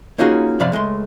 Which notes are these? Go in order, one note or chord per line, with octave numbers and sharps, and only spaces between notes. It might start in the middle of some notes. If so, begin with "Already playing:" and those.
A#3 C#4 D#4 F4 F#4 G#4
F#2 C3 F3 D5 F5 B5
C#2 G#3 A3 C6